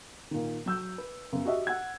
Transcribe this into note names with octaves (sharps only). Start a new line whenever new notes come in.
A#2 D#3
F#3 E6 G6
B4
F#2 C#3 B3
F#4 G4 D#5 E5
F#5 E6 G#6